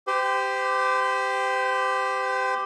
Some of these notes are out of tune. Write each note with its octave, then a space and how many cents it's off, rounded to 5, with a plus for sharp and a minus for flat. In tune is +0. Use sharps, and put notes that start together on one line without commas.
G4 +0 C5 -35